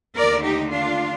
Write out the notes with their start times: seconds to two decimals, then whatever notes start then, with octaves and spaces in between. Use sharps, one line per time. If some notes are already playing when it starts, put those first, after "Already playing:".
0.15 D#2 D3 A3 A#4 D5
0.43 D#4 G4
0.71 D4 F4